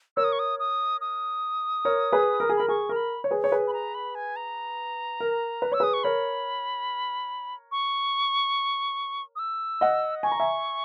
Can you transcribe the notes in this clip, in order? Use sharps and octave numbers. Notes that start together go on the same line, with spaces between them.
A#4 C#5 E6
D#6
C#6
D#6
D#6
D#6
A#4 C#5
G#4 B4
A#4
G#4
A#4 B5
G#4 C#6
A#4 A#5
B5
C#5
G#4 B4
C#5
G#4 B4
B5
A#5
B5
G#5
A#5
A#4
B4
C#5 E6
G#4 B4 D#6
C#6
A#4 C#5 B5
C#6
D#6
E6
D#5 F#5
G#5 C#6
A#5
E5 G#5